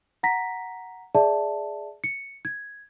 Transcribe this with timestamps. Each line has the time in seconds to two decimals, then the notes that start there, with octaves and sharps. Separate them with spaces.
0.23 F#5 A#5 A#6 B6
1.15 G#4 D5 E5 A5
2.04 C#7
2.45 G#6